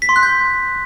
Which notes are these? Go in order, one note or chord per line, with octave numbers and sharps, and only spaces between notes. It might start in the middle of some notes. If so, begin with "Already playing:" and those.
B6
C6
F#6
G6